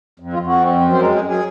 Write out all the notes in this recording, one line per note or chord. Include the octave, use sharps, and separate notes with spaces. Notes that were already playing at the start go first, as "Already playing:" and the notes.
F2
F4
F2
F#4
C4
F#2
C5
G#3 A#4
G#4
F#2
G#4